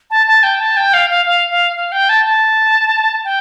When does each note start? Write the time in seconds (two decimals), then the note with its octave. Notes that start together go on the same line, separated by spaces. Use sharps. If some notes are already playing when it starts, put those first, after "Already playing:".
0.11 A5
0.27 A5
0.43 G5
0.60 A5
0.77 G5
0.94 F5
1.10 F5
1.26 F5
1.51 F5
1.76 F5
1.92 G5
2.09 A5
2.26 A5
3.25 G5